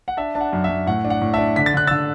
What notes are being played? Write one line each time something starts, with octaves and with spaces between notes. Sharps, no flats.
F#5
D4 E5 A5
D4 A5
F#5
F#2
F#2 E5
A2 F#5
D4
F#5
A2
D4 E5 A5
D3 B6
A6
D3 F#6
D3 E6 A6